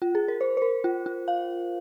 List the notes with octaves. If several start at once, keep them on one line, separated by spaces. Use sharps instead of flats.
F4
G#4
A#4
C5
C5
A#4
F4
F4
F5